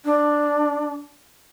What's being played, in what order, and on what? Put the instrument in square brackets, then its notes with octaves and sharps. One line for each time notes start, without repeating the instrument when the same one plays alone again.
[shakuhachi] D4